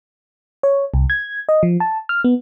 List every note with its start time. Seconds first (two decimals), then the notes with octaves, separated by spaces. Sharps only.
0.63 C#5
0.94 C2
1.10 G#6
1.49 D#5
1.63 F3
1.80 A5
2.09 F6
2.24 B3